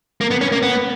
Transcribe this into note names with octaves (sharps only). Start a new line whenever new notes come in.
A#3
B3
C#4
A#3
B3